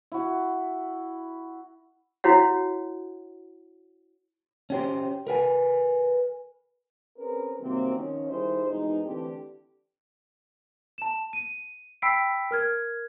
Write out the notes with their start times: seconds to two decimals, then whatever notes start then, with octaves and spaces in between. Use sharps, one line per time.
0.12 E4 F#4
2.24 E4 F#4 C#5 F#5
4.70 C#4 G4 C5
5.27 A#4 B4 G5 G#5
7.18 C4 C#4 G#4 A#4 B4
7.60 C3 D#3 F#3 G3 A#3 C4
7.94 D#3 F3 C#4
8.29 D#3 G3 D#4 E4 G#4 C5
8.67 F2 B2 E3 G#3 D#4
9.04 D3 E3 A3 C4 D4 G4
10.98 A5 E7
11.33 D#7
12.02 G5 B5 E6 B6 C7 D7
12.51 A#4 F6 G#6